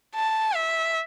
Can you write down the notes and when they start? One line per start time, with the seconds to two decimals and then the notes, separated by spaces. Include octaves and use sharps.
0.15 A5
0.55 E5